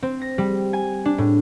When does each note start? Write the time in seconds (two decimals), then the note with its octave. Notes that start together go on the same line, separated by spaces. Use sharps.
0.03 C4
0.22 A#6
0.38 G3
0.73 G#5
1.05 D4
1.18 A2